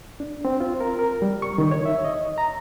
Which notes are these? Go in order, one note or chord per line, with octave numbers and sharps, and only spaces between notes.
D4
C4
F4
A#4
A#4
G3
C#6
D#3
C#5
E5
D#5
A#5